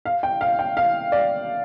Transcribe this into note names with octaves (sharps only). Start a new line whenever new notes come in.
F5
G5
F5
G5
F5
D5